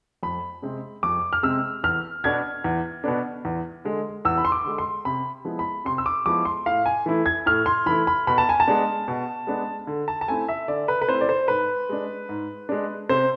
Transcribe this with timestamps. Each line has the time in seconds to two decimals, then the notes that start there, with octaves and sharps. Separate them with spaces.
0.23 F2 B5
0.62 C3 G#3 C4
1.03 F2 D6
1.33 F6
1.43 C3 G#3 C4 E6
1.84 E2 F6
2.24 B2 B3 D4 G#6
2.64 E2
3.04 B2 B3 D4
3.45 E2
3.85 D3 G#3
4.25 E2 E6
4.38 B5
4.45 C6
4.52 D6
4.64 D3 G#3
4.78 C6
5.05 C3 B5
5.45 F3 G#3 B3 E4
5.59 B5
5.85 C3 C6
5.98 E6
6.06 D6
6.26 F3 G#3 B3 E4 D6
6.45 C6
6.66 A2 F5
6.86 G#5
7.06 E3 A3 E4
7.26 G#6
7.46 A2 F6
7.66 C6
7.86 E3 A3 E4 B5
8.07 B5
8.27 B2 B5
8.38 A5
8.49 G#5
8.60 A5
8.68 G#3 B3 D4
9.08 B2
9.47 G#3 B3 D4
9.87 D3
10.08 A5
10.21 A5
10.28 A3 C4 E4 G#5
10.49 E5
10.68 D3 D5
10.88 B4
11.02 B4
11.08 A3 C4 E4 C5
11.21 D5
11.29 C5
11.48 G#2 B4
11.89 G#3 D4
12.29 G#2
12.69 G#3 D4
13.09 C3 C5